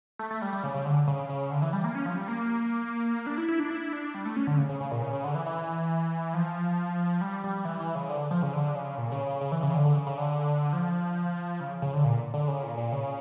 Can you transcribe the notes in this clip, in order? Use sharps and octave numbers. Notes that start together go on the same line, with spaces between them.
A3
A3
G3
G3
C#3
C#3
D3
C#3
C#3
D3
E3
G3
A#3
C#4
F3
G3
A#3
D4
E4
E4
D4
E4
D4
G3
A3
C#4
D3
C#3
C#3
C#3
A#2
C#3
C#3
D3
E3
E3
F3
G3
G3
E3
E3
C#3
D3
F3
C#3
D3
C#3
A#2
C#3
C#3
C#3
E3
C#3
D3
D3
C#3
C#3
D3
F3
C#3
C#3
D3
A#2
D3
C#3
A#2
A#2
C#3